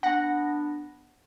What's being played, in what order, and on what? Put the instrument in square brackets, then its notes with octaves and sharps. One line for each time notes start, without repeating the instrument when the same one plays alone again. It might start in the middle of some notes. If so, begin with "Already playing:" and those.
[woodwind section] B3 D4 [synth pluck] F#5 A#6